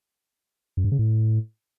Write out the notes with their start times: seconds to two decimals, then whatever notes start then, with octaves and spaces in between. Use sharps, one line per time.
0.77 F#2
0.84 G2
0.92 C#3
0.99 A2